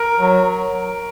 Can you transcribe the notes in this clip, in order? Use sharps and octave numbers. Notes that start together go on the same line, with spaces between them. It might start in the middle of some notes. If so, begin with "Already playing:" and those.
Already playing: A#4
F#3